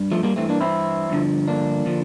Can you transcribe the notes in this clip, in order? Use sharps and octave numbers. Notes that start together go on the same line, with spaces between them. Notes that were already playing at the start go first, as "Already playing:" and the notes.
Already playing: G2
F3 A3
G3 A#3
G2 E3 A3 C4
A#3 D4
C4 E4
G2 D3 F3
A#3 D4
D3 F3